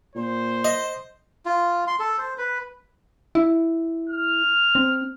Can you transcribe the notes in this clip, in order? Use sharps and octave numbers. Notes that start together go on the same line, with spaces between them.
A#2 C5
D#5
F4
C6
A4
C5
B4
E4
F6
C4